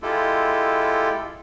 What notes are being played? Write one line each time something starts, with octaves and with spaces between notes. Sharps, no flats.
G#3 E4 F4 G4 A4